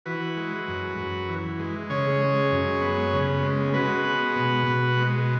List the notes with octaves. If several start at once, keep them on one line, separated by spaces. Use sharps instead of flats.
E3 F#4 B4
G#3
F#2
F#2
E3
G#3
C#3 G#4 C#5
G#3
F#2
B3
C#3
G#3
G#3 F#4 B4
B3
B2
B2
G#3